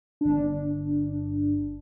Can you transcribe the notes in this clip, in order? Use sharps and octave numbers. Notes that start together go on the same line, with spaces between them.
G1 D4